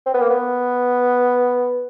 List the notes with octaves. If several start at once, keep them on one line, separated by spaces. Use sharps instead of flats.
C4
B3
A#3
B3